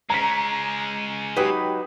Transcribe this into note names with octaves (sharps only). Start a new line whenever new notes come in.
G#3 C#4 A#5 B6
F#3 D#4 G4 B4